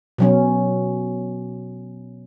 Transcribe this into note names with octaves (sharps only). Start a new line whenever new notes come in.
B2 F#3 C#4